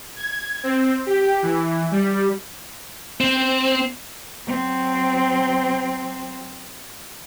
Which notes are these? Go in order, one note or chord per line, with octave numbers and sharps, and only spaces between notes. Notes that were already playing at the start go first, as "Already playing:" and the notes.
G#6
C4
G4
E3
G3
C4
F#3 C4